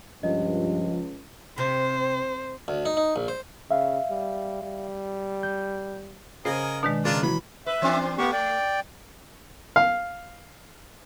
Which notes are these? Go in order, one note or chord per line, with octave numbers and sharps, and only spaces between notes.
C#2 G2 F3 D#5
C3 C5
D2
D#4
D#4
A#1
C5
C#3 E5 F5
G3
G3
G6
C#3 A#4 C5 D#5 G#5
B2 D#3 G#3 D4
C#3 G#3 D4 F4 A#4 A6
E3 F#3 B5
B4 E5
E3 C4 D4
A3 B3 G4 C#6
D5 G5
F5